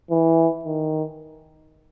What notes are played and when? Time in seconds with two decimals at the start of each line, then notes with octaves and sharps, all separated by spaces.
0.10 E3
0.65 D#3